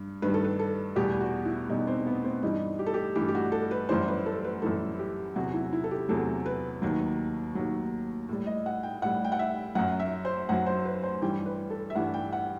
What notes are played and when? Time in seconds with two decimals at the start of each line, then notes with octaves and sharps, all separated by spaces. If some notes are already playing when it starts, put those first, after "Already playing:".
Already playing: G2
0.22 G2 D#3 G3 B4
0.34 A4
0.44 B4
0.59 A4
0.96 E2 B2 G3 G4
1.21 F#4
1.45 E4
1.69 E2 B2 G3 D#4
1.87 C4
2.07 B3
2.24 C4
2.42 G2 E3 G3 D#4
2.79 G4
2.86 A4
2.94 G4
3.15 G2 E3 G3 G4
3.28 G4
3.35 F#4
3.52 A4
3.71 B4
3.89 F#2 E3 G3 C5
4.08 B4
4.26 A4
4.44 B4
4.62 F#2 E3 G3 A4
4.99 G4
5.36 E2 C3 F#3 F#4
5.54 E4
5.73 E4
5.84 A4
5.91 G4
6.09 E2 C3 F#3 A4
6.46 B4
6.82 D#2 D#3 F#3
7.55 D#2 D#3 F#3
8.29 A2 G3
8.47 D#5
8.66 F#5
8.83 G5
9.02 A2 G3 F#5
9.24 G5
9.32 F#5
9.39 E5
9.75 F#2 F#3 F#5
10.00 E5
10.25 C5
10.49 F#2 F#3 F#5
10.66 C5
10.85 B4
11.03 C5
11.21 G2 E3 G3 G5
11.46 B4
11.70 A4
11.90 E5
11.95 G2 E3 G3 F#5
12.14 G5
12.33 F#5